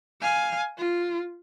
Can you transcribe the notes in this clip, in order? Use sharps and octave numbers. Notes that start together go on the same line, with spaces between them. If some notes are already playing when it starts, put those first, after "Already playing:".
F5 G#5
F4